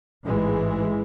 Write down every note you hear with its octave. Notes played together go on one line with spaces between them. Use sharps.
A1 G#2 E3 G#3